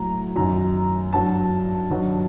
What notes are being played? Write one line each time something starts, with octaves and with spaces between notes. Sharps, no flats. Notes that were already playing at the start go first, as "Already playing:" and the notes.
Already playing: A2 F#3 A#5
F#2 D#3 F#3 A#5
G2 F#3 A5
G2 D#3 F#3